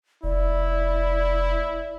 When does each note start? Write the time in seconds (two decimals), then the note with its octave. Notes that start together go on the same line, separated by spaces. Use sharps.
0.23 F1 E4 D5